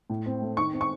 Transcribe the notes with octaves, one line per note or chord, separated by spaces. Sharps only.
A2
C4
A3
D#3 C#6
C4
C#6